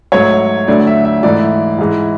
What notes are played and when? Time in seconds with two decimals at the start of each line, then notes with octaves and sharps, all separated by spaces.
0.12 G#2 F#3 A3 C#5
0.67 D2 D3 F#3 A3 D5
0.87 E5
1.05 E5
1.23 G#2 E3 A3 D5
1.79 G#2 E3 G#3